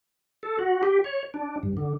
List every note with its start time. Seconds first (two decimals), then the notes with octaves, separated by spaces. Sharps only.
0.43 A4
0.59 F#4
0.83 G4
1.04 C#5
1.34 D4
1.63 G2
1.77 D3